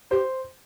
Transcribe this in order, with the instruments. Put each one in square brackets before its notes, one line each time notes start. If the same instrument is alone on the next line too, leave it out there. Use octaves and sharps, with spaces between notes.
[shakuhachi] G4 [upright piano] C5